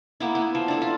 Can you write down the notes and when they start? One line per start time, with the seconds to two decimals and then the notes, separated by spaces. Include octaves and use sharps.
0.20 A#3 B3 E4
0.35 B3
0.55 F3
0.68 D4 E4 A4
0.82 F4